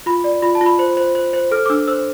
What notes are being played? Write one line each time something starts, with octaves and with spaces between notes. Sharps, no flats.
F4 B5
D5
F4 B5
A5
F4
B5
C5
C5
C5
C5
A4 F6
D6
D4 E6
C5 E6